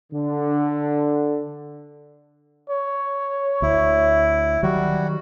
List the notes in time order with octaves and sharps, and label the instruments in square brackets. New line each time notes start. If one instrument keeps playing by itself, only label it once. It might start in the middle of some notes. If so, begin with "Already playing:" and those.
[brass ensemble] D3
[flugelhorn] C#5
[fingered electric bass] D2 [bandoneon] E4
[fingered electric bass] D#3 F#3 [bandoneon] G3 F#4